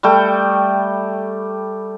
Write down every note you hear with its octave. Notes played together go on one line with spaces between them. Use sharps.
G3 A3 G5